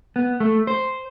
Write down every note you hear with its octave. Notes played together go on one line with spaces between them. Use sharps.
B3
A3
C5